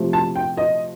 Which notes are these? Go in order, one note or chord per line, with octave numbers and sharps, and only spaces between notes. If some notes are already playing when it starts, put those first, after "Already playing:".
Already playing: C3 F3 A3
A5
G5
D#5